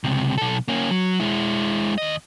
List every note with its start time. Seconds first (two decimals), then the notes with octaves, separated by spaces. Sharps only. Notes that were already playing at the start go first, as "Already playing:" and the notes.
0.04 C#2 C3
0.38 B1 A4
0.68 A#3 C#4
0.91 F#3
1.20 G#3 E4
1.98 D#2 D#5